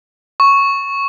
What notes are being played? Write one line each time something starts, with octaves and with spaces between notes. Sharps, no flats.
C#6